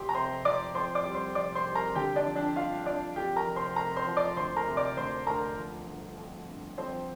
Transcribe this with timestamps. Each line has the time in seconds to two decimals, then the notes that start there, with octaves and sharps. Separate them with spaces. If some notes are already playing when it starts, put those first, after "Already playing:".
Already playing: F1 F2 G4 G5 C6
0.09 A#5
0.14 C3 C5 C6
0.45 F2 D5 D6
0.75 F2 C5 C6
0.95 D5 D6
1.05 G3
1.15 C5 C6
1.35 F1 D5 D6
1.55 C5 C6
1.66 G3
1.75 A#4 A#5
1.95 D3 G4 G5
2.16 D4 D5
2.25 F3
2.35 D4 D5
2.56 G1 F4 F5
2.86 F3 D4 D5
3.16 F2 G4 G5
3.36 A#4 A#5
3.47 F1
3.56 C5 C6
3.76 F1 A#4 A#5
3.96 C5 C6
4.07 F3
4.17 D5 D6
4.37 D2 C5 C6
4.56 A#4 A#5
4.67 C3
4.77 D5 D6
4.97 D2 C5 C6
5.27 D2 A#4 A#5
5.57 F3
5.87 G1
6.18 F2
6.48 G1
6.78 F2 C4 C5